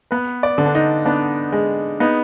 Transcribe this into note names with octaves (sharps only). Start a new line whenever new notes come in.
B3 B4
D5
D3
D4
D#4
B3 D4
G#3
B3 D#4